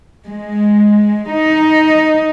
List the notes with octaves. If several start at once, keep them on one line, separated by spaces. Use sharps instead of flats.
G#3
D#4